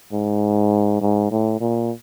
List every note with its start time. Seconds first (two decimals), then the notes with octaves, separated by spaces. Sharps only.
0.12 G#2
1.01 G#2
1.31 A2
1.60 A#2